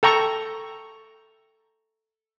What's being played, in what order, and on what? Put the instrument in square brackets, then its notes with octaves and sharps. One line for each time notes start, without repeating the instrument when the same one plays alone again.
[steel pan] A4 G5 A#5 C#6